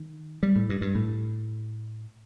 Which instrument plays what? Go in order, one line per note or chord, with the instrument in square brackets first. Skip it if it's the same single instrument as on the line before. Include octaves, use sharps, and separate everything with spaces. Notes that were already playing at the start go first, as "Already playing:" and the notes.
Already playing: [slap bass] D#3
G3
A2
G2
G2
A2